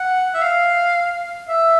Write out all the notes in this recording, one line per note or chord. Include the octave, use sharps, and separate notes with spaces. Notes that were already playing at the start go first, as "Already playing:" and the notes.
Already playing: F#5
E5
F5
E5